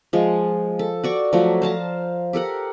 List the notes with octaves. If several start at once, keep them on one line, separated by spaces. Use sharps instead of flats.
F3 G#3
A4
F#4 D5 C#6
F3 F#3 A3 F#4
C5 F5 A5 A#5
G4 A4 A#4 F#5